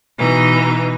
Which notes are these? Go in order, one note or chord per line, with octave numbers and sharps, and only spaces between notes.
B2 E3 D#4